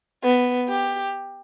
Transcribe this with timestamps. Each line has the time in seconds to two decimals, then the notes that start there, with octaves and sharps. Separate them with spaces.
0.23 B3
0.68 G4